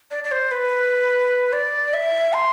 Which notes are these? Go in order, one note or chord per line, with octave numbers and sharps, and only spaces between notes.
D5
D5
C5
B4
D5
E5
C6